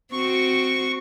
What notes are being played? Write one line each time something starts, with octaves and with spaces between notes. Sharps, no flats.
C4 F#4 C#6